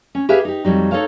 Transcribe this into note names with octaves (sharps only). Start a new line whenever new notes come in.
C#4
G4 G#4 B4 E5 F5
D#4 G4
F2 F#3 G3 D#4
D#4 A4 C5 C#5 F5